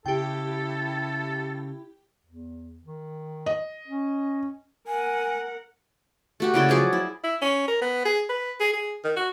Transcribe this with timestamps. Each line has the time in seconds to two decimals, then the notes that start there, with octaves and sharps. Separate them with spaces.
0.06 C#3 E4 G4 A4 G5
2.26 E2
2.84 D#3
3.46 D#5
3.88 C#4
4.87 A#4 F#5 G#5
6.40 A3 F#4 G4
6.54 C#3 E4 D5 G5
6.69 F3 F#3 G#4 D5
6.93 E4
7.24 E4
7.42 C#4
7.68 A#4
7.82 B3
8.05 G#4
8.29 B4
8.60 G#4
8.73 G#4
9.04 D#3
9.16 F#4